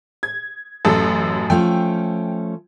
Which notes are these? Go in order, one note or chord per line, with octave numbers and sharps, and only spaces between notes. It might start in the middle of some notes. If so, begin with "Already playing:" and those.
G#6
A1 F#2 A4
F3 A3 C#4 G5